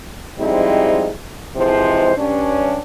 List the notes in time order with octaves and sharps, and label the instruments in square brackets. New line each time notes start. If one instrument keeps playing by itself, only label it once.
[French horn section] F3 G3 G#3 C4 D#4 E4
G#2 C3 E3 F3 G#3 C5
G2 C#4 D4